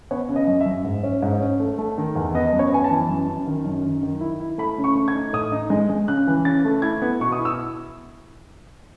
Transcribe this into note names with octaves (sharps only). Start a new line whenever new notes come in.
B3 C#5
C#3
D#5
F#2
E5
F#2
G#2
C#4
G#2
C#4
A3
A3
D#3
E2
B3 D#5
F#2
C#5
B3 G#5
A5
E3
F#2
F#2
D#3
F#2
D#3
D#3
E4
E4
A3 B5
C#3
C#6
A3
G#6
D#4
A2 D#6
D#4
G#3
G#3
C#3 F#6
E3
C#3 A6
A3
E4 G#6
B3
B2 C#6
D#6
E4
E6